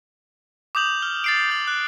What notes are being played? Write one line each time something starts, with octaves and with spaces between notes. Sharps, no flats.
D6 D#6 G6 F7 F#7
F6 G7
A6 C7 D7
G6 F#7
F#6